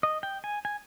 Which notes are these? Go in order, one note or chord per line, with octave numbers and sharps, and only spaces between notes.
D#5
G5
G#5
G#5